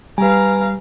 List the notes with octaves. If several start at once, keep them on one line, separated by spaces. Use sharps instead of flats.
G3 B4 F5 G#5 A#5